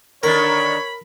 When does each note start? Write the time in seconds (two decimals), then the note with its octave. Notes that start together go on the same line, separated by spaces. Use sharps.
0.23 D3 D#3 D4 A#4 C#5 B5